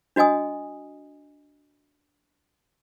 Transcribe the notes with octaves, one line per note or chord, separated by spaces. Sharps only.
D4 F#4 D#5 G#5 D#6